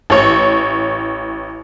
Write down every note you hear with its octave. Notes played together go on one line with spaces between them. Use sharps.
A1 C#5